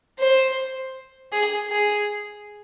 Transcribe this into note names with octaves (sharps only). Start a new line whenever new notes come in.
C5
G#4
G#4